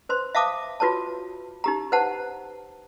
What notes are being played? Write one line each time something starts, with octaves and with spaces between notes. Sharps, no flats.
B4 C5 C6
E5 F5 A5 D6 D#6
F4 F#4 B4 C#5 A5
D#4 G4 A#5
B4 C5 F#5 A5